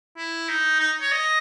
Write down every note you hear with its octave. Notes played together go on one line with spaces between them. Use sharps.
E4
D#4
D#4
C#5
D#5